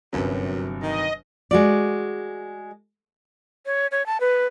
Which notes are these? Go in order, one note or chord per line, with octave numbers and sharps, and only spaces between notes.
G1 F#2 C3 F#3
D#3 D#5
G#3 F#4 D5
C#5
C#5
A5
B4